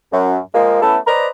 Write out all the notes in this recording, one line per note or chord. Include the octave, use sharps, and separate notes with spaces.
F#2
F3 G#3 A#3
A3 B3 C#4 E4 A4
B4 C5 D5 D#5 A#5